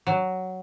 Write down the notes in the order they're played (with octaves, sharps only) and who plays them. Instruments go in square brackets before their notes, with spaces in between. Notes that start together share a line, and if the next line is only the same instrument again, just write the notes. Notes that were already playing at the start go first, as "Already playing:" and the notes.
[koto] F#3